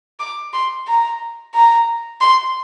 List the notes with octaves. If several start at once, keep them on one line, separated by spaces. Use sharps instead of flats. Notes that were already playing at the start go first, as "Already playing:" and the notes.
D6
C6
A#5
A#5
C6